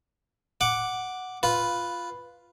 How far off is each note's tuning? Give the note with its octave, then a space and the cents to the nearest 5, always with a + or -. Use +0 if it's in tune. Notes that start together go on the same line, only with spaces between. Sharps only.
F#5 +0 D6 +0
F4 +0 B4 +0